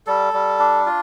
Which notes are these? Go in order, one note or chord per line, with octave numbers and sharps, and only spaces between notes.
G3 A4
G3
D4
F4